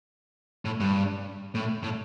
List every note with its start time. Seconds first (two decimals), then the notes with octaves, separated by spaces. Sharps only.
0.65 A2
0.80 G2
1.55 A2
1.83 A2